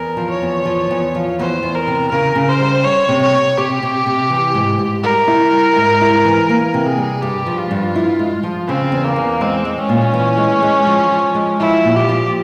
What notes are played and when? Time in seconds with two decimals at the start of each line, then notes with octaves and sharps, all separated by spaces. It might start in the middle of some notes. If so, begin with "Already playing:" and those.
Already playing: E2 A#4
0.17 F3
0.30 C#5
0.42 E2
0.65 F3
0.91 E2
1.15 F3
1.39 E2 C5
1.63 E2
1.75 A#4
1.87 C3
2.12 C#3 A#4
2.36 C#3
2.49 C5
2.60 G3
2.84 G3 C#5
3.09 C3
3.21 C#5
3.34 C4
3.58 C3 G4
3.83 C3
4.06 C3
4.30 E3
4.54 G#2
4.79 G#2
5.03 G3 A#4
5.28 E4
5.53 G3
5.76 G#2
6.01 E4
6.25 E3
6.49 A#3 A#4
6.74 C3
6.86 G#4
6.98 G3
7.22 G2 G4
7.46 F3
7.58 F4
7.71 G2
7.96 E4
8.19 G#3
8.43 F3
8.68 C#3 C4
8.92 E2
9.04 A#3
9.16 E2
9.41 G#3 C4
9.65 G#3
9.78 C#4
9.89 A#2
10.14 E3
10.38 G#3
10.62 G#3
10.87 F3
11.12 F3
11.35 G#3
11.60 F3 E4
11.85 A#2
11.96 G4
12.09 F3